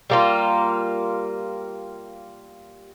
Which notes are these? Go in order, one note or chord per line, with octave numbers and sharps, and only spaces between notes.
G3 A#3 F4